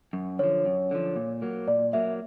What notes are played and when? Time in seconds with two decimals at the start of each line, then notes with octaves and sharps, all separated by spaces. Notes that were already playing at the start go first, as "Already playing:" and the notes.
0.13 F#2
0.39 D3 F3 C#5
0.66 F#2
0.91 D3 F3
1.16 A#2
1.42 F#3 A#3
1.68 A#2 D5
1.93 F#3 A#3 E5